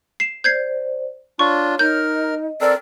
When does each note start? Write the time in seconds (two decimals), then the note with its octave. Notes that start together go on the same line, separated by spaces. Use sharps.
0.20 C7 E7
0.44 C5 D5 G6 G#6 C7
1.39 D4 F4 C#5 C#6
1.79 D#4 A#4 F6 G6
2.15 D#5
2.61 C4 A4 A#4 D5